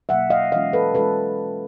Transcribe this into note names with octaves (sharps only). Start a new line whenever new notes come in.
B2 F#3 A#3 E5 F#5
D#5 F5
E3 G#3 C#4 F4 D#5 F5
A4 B4
E3 G#3 C#4 F4 A4 B4